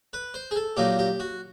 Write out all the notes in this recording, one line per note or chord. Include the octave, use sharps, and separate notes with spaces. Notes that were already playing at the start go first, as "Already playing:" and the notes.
B4
C5
G#4
A4
A#2 F#3 A#3 D#4 G4
G4
F#4